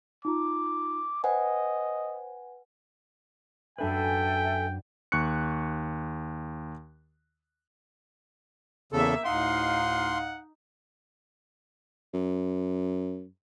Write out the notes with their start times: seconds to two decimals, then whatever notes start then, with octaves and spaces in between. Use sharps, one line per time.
0.25 D#4 F4 A#5 D6
1.24 B4 C5 D#5 F#5 G#5
3.78 F#2 D4 A4 B4 E5 G5 G#5
5.12 D#2 C#6 F#6 C#7
8.93 E2 C#3 A#3 A4 E5
9.25 D2 A2 D#4 F5 F#5 C6
12.14 F#2